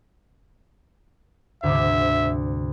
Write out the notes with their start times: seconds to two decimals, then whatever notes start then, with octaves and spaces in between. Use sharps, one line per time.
1.63 D2 G#2 C3 E5